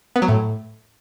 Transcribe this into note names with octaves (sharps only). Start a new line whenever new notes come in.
B3
F#3
A2